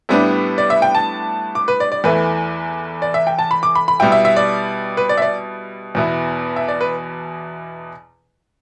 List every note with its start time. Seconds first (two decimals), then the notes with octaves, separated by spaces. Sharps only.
0.09 A2 G3 B3 D4 E5
0.58 D5
0.70 E5
0.82 G5
0.95 A5
1.55 D6
1.68 B4
1.80 D5
1.92 D5
2.04 E2 E3 A3 E4 B4
3.02 D5
3.14 E5
3.27 G5
3.39 A5
3.51 B5
3.63 D6
3.75 B5
3.88 B5
4.00 B2 G3 E4 G5
4.12 E5
4.25 E5
4.36 D5
4.97 B4
5.09 D5
5.17 E5
5.22 D5
5.95 E2 B2 B3 E4
6.56 E5
6.68 D5
6.81 B4